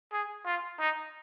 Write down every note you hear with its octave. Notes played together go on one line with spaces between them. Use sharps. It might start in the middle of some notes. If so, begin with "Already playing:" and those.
G#4
F4
D#4